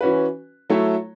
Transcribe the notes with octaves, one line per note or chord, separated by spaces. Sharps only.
E3 C#4 F#4 B4
F#3 A3 E4 A4 C#5